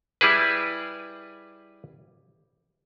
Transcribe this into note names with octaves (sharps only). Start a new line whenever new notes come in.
G3 E4 G#4 B4